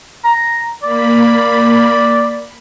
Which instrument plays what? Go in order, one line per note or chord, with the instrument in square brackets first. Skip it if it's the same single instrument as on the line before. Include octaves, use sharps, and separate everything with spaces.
[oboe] A#5
[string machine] A#3 B5 [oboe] D5